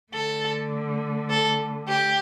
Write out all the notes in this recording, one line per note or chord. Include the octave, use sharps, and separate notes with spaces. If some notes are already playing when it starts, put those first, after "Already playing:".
D3 A3 A4
A4
G4